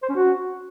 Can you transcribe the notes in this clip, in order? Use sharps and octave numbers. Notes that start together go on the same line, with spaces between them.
C5
C#4
F#4